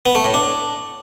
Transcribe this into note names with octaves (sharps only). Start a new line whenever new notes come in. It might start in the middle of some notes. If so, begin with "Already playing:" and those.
B3
A3
A2
D4